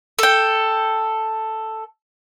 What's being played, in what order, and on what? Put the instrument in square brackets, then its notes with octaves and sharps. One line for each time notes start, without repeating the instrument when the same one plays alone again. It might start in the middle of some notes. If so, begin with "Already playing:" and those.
[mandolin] A4 G5